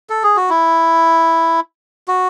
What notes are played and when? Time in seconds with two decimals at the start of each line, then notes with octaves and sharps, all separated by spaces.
0.10 A4
0.23 G#4
0.37 F#4
0.50 E4
2.08 F#4